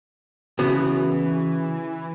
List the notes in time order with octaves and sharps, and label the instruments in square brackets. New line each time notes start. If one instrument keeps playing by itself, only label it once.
[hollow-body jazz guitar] C#3 B3 [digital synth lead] E3 [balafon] F#4